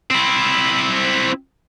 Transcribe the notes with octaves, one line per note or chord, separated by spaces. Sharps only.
C4 E4